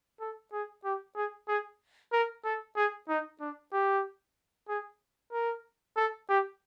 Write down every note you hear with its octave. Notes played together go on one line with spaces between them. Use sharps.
A4
G#4
G4
G#4
G#4
A#4
A4
G#4
D#4
D4
G4
G#4
A#4
A4
G4